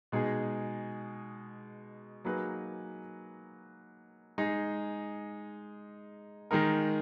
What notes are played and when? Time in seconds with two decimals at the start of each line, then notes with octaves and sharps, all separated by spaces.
0.12 B2 G#3 D#4 G#4
2.25 F#3 A#3 D#4 G#4 B4
4.38 G#3 D#4 G#4
6.51 D#3 G#3 D#4 A#4